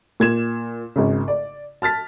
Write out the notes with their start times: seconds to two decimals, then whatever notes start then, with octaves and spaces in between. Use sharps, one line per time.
0.20 A#2 G#6 E7
0.96 G#1 C#3
1.28 D5
1.82 A5 F6 A6 B6